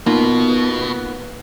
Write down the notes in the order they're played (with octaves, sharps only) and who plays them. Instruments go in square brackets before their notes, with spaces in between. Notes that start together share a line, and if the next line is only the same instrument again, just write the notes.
[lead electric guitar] B2 [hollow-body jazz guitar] A#3 B3 F4 [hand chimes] D#4